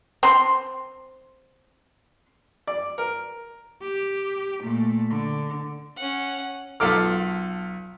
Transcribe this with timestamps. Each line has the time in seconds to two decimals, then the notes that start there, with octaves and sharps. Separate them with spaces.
0.23 C4 C6
2.67 D5
2.98 A#4
3.82 G4
4.62 A#2 A3
5.10 D3
5.97 C#4 F#5
6.80 B1 F4 A4 D6 F6